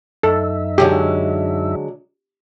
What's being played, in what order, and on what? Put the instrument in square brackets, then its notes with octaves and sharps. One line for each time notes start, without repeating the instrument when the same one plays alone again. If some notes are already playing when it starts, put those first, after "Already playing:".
[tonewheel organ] F#2 D#4 E5 [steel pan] A4
[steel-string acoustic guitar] D3 F#3 G#3 [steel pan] G4